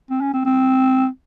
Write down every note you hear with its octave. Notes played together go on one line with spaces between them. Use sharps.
C4
C#4
C4
C4